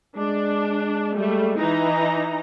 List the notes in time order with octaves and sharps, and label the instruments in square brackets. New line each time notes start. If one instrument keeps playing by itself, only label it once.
[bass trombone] G#3 [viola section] D4
[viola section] G3 A3
E3 D#4 A#5